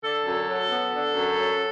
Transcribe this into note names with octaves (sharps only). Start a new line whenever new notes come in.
D3 A4
F#2
F#3
B3
D3
F#2
F#3